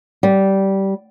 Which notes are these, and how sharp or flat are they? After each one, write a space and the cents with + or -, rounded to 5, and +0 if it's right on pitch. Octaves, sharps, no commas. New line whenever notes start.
G3 -15